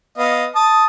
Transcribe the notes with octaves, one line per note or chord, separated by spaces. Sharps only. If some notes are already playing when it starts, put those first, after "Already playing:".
B3 D#5 F5
A5 D#6